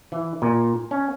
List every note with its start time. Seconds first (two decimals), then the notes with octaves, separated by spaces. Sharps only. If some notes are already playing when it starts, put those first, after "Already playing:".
0.12 E3
0.42 A#2
0.91 C#4